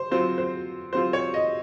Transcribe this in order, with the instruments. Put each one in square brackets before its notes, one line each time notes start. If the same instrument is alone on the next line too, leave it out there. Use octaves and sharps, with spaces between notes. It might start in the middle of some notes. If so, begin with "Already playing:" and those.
Already playing: [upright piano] C5
F#3 C4 F4 C5
C5
F#3 C4 F4 C5
C#5
D#5